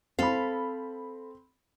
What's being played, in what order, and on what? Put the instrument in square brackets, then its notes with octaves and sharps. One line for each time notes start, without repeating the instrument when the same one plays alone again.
[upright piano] C4 B5 [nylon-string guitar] A4 F5